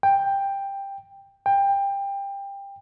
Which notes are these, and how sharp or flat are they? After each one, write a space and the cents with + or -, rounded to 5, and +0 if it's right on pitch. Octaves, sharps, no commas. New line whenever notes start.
G5 +10
G5 +20